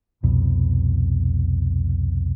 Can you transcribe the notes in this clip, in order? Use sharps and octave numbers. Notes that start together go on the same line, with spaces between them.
C2 F2 B2